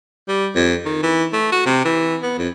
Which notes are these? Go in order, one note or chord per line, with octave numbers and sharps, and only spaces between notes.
G3
F2
D#3
E3
A3
F#4
C3
E3
B3
F2